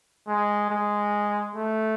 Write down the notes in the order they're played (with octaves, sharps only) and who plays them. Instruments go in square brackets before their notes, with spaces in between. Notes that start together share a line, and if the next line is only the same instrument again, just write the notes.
[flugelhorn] G#3
G#3
A3